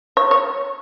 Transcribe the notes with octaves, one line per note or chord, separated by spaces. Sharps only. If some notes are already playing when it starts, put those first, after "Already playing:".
C#5
C#5